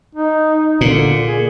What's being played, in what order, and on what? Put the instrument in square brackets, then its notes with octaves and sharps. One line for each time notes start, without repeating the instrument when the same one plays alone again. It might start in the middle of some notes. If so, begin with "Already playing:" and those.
[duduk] D#4
[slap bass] A#2 [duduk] D3
[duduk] G#4